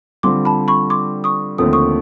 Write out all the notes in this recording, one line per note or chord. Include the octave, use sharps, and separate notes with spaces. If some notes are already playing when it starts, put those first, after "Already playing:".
D3 G3 C4 F4 C6 D6
A5 B5
B5 C#6
C6 D6
C#6 D#6
D#2 D3 F3 A3 C4 D#6
C#6 D#6